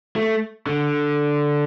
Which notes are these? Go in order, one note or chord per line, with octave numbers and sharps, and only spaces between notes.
A3
D3